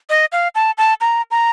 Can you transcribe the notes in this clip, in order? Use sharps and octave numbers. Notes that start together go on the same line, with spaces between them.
D#5
F5
A5
A5
A#5
A#5